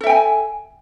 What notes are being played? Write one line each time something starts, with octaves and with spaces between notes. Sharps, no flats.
A4 E5 G5 G#5